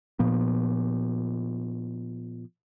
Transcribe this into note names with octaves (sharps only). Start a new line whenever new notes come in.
A#2 F3 B3